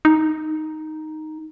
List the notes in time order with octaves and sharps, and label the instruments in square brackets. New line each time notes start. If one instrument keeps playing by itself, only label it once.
[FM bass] D#4